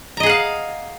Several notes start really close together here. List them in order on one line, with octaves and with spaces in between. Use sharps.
A#5 D#5 G#4 F#5 F5